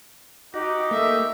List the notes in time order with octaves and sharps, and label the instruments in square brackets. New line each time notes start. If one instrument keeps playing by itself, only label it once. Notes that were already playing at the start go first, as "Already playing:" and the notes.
[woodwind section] D#4 G4 [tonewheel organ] F#4
[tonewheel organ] A3 A#3 [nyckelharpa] E5